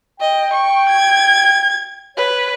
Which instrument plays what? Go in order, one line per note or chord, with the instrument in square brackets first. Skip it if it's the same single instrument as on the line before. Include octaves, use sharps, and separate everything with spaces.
[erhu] D#5 [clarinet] G5
[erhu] C#6
G#6
[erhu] B4 [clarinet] C#5